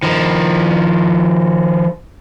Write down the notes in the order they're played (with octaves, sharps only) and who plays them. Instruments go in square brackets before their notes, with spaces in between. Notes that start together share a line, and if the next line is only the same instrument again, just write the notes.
[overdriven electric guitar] D#3 F3